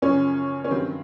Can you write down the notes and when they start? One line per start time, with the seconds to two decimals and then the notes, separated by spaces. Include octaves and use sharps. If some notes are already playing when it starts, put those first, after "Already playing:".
0.02 F#2 C#3 F3 C#4
0.64 C#4
0.70 G2 D#3 F#3 C4